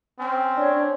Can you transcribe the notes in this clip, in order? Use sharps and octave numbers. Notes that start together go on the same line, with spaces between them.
C4 C#4
D4 C#5